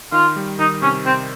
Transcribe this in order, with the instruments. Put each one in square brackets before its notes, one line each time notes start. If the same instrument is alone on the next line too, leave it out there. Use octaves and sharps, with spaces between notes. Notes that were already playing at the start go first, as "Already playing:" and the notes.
[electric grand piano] D#3 [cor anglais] F4
[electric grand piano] G3
[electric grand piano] D#3 [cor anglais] D#4
[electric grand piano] C3 [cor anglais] C#4
[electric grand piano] C3 [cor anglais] C4